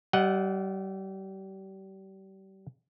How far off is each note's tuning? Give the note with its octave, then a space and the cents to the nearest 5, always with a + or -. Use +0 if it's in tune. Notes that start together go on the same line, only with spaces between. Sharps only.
G3 -35 D#5 +0 F#5 +0